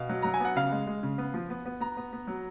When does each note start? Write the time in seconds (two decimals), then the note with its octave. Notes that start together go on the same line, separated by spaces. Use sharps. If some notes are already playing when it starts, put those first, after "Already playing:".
Already playing: B2 F5
0.09 F#3
0.22 F#3 A#5
0.34 G#5
0.40 B3 F#5
0.56 C#3 F5
0.72 G#3
0.87 G#3
1.03 C#3
1.18 B3
1.34 F3
1.50 B3
1.66 B3
1.80 B3 A#5
1.97 B3
2.13 B3
2.27 F#3